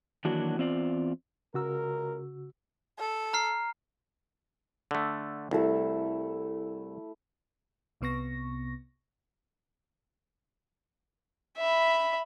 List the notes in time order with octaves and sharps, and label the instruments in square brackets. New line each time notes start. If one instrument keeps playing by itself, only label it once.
[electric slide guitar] D#3 E3 F#3 A#3 D4 F#4
E2 C4 F4 D5
[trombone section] C#2 A#4 [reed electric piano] C#3 F#4 E6
[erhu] A4
[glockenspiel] A#5 F6 C7
[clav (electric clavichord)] D3 A3
[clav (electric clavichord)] C2 [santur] A3 E4 E5
[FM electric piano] C2 C3 B3 C#6 A#6
[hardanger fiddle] E5 B5